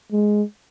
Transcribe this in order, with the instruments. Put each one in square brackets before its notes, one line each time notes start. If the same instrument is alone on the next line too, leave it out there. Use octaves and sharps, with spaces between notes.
[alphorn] G#3